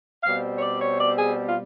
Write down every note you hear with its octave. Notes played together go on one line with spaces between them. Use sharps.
B2 G3 C4 F5
C#5
D5
C#5
D5
G#4
F4